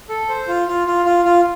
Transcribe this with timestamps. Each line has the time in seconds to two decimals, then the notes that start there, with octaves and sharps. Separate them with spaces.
0.09 A4
0.29 C5
0.48 F4
0.67 F4
0.87 F4
1.06 F4
1.25 F4